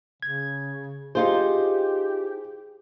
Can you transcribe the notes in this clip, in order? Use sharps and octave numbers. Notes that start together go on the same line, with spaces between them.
C#3 G#6
D#4 F4 G4 G#4 C5